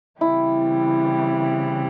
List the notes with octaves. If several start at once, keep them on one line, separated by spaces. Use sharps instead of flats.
C#3 E3 G3 C4 E4